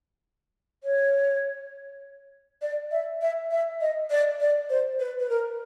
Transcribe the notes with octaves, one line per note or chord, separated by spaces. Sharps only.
C#5
D5
E5
E5
E5
D#5
D5
D5
C5
B4
B4
A#4